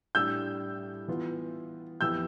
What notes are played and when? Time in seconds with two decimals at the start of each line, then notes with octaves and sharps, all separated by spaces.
0.15 A2 G3 D4 E6 G6
1.08 E3 B3 F4
2.00 F2 E3 B3 E4 G4 E6 G6